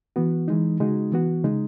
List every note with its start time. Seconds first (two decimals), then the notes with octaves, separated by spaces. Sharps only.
0.16 E3 B3 F#4
0.48 E3 G#3 D#4
0.80 C#3 G#3 D#4 F#4
1.12 E3 B3 F#4
1.44 C#3 G#3 D#4